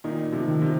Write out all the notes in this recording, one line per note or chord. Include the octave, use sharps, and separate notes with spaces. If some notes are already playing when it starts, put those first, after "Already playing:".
A#2 D#3 D#4
C3 F3
D#3
C3 F3